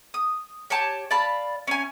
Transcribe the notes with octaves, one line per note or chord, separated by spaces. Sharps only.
D#6
G4 C#5 G#5 A5
D5 F5 A5 B5
C#4 G#5